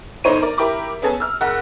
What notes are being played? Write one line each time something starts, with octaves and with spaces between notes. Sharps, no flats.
G1 D#4 C5 C#5 D#7
A#4 D5
E4 G4 A#4 B5 D6
B3 C#4 G#4 A4 G#5
E6 F6
F#1 F#5